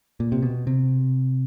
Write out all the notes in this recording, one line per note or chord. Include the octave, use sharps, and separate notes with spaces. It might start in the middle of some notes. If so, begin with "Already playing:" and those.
A#2
C3
B2
C3